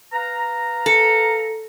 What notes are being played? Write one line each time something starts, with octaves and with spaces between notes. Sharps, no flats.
B4 F5 A#5
A4